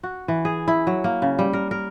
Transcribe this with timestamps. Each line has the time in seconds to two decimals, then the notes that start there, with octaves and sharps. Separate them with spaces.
0.03 F#4
0.28 E3
0.45 G#4
0.68 E4
0.87 F#3
1.04 A#3
1.22 C#3
1.39 G3
1.53 A#4
1.71 A#4